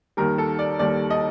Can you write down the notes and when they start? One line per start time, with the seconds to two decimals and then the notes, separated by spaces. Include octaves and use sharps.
0.17 D#2 D#3 G3 A#4
0.38 A4
0.59 D5
0.79 D#2 D#3 G3 D5
1.10 D#5